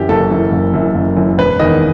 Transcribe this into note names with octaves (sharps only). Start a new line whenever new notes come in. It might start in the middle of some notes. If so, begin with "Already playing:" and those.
Already playing: F#2 E3 G4
F#1 A4
F#2 E3
F#1
F#2 E3
F#1
F#2 E3
E1 B4
E2 D#3 D#5